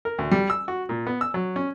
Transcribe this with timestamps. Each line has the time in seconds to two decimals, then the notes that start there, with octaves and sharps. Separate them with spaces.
0.05 A#4
0.19 D2
0.31 G3
0.50 E6
0.68 F#4
0.89 A#2
1.07 B3
1.21 E6
1.34 F#3
1.56 C#4